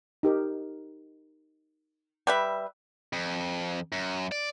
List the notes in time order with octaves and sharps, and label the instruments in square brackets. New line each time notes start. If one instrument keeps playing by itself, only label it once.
[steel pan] D#4 G4 A#4
[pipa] G3 B4 E5
[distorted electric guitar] F2
F#2
D5